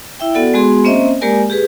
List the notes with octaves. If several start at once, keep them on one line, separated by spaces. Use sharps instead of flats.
E4 E5 G5
B3 F#4 A4 D5 F#5
G#3 B3 F#4 G#4 C6
A#3 C4 C#4 C5 D#5 E5
G#3 A#3 G4 A#4 D5 G#5
G4 G#4 B4